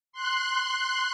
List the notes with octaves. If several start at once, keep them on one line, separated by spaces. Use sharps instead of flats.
C6 F#6